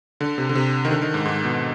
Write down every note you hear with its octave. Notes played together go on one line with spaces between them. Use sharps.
D3
C3
D3
C3
D#3
D3
D#3
G#2
G#2
B2